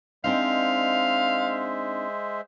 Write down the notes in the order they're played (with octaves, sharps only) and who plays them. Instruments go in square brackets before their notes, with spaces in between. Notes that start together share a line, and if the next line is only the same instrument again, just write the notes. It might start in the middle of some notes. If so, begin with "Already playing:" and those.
[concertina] G#3 C5 E5 [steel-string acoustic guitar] C4 D4 D#4 [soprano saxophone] F5